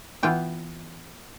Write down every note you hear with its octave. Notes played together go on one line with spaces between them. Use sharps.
E3 B3 F4 G5